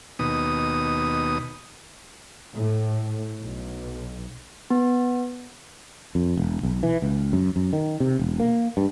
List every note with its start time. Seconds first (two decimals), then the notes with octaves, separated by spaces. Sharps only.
0.19 D#2 B2 D#6
2.54 A2
3.40 B1
4.70 B3
6.15 F2
6.37 E1
6.63 B1
6.83 E3
7.02 C#2
7.33 F#2
7.56 F#2
7.73 D#3
8.00 C3
8.19 E1
8.40 A#3
8.77 G2